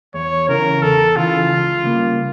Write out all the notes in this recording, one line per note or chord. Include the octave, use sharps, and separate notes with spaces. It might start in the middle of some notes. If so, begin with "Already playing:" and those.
E2 C#5
C#3 E3 A#4
E2 A4
C#3 E3 F4
C#2
C#3 G3 A#3